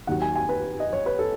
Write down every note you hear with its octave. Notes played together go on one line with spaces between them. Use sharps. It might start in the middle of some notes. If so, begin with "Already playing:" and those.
D#2 D#3 F#3 F#5
G#5
G#5
B4
D#5
C#5
B4
A4